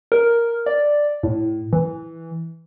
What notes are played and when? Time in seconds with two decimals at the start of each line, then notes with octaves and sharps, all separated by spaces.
0.12 A#4
0.66 D5
1.23 A2
1.73 E3